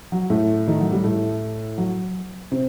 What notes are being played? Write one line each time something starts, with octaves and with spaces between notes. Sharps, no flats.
F#3
A2 A3
D#3
F#3
G3
A2 A3
F#3
C3 C4